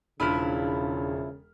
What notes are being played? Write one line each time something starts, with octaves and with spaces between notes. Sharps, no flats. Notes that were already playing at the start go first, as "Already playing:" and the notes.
E1 C#3 F3 D4 E4 F4 B5 F6